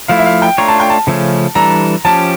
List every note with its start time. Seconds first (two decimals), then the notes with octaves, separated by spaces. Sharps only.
0.08 F3 A3 E4 F5
0.19 E5
0.26 F5
0.42 G5
0.58 A3 D4 F4 C#5 A#5
0.68 A5
0.80 G5
0.90 A5
1.07 C#3 F3 A3 C#4
1.55 E3 G3 D4 A4 A#5
2.05 F3 C#4 G4 A5